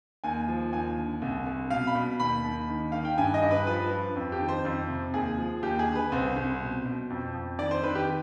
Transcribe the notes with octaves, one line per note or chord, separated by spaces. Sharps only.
D#2 G#5
F3
D#2 G#5
D3
C2
C2
B2 F5
B5
B2
D#2 B5
D#2
D#3
D#3 F5
G5
G2 G#5
D#5
G2
B4
F3 B4
F3
F2
G4
D#3
C5
F2
C3
D#2 G#4
F3
D#2 G4
G#4
D3
B4
C2 C5
C2
B2
B2
F2
F2
D#3 D5
C5
D#3 B4
G4